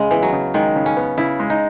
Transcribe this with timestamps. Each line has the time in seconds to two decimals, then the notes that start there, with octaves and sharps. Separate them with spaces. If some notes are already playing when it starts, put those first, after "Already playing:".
Already playing: C#3 G#3
0.11 E3 B3
0.23 F#3
0.32 C#3
0.54 D#3 G#3
0.76 C#3
0.86 C#4
0.97 B3
1.18 C#3 E4
1.40 G#3
1.50 D#4